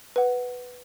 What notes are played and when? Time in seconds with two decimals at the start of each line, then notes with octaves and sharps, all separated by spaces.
0.16 B4 F#5